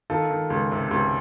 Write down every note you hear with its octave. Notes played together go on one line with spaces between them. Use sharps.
D#3 F4 A4
D#3
C#2
C3
C#2